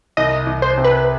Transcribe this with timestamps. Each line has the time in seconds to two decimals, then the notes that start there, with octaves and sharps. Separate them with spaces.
0.17 C2 D#5
0.47 C2
0.62 C5
0.78 C3
0.84 B4